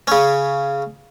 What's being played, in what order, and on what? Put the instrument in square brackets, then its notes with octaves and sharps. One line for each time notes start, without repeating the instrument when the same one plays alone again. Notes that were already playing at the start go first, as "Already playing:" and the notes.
[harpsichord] C#3 C#4